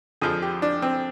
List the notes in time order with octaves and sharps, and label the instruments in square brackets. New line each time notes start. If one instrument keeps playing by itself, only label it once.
[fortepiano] F2 D3 F3 G#4
G4
D4
C4